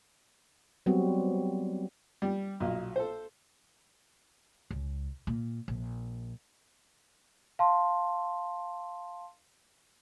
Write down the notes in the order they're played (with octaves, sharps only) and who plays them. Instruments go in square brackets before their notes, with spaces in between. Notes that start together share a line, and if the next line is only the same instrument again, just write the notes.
[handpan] F#3 G3 B3 C4 F#4
[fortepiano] G3
B1 A#2
A4 C5
[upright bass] C#2
A#2
A#1
[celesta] F5 A5 C6